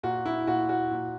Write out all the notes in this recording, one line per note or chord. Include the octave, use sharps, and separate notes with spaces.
A#2 F#4
E4
A#2 F#4
F#4
A#2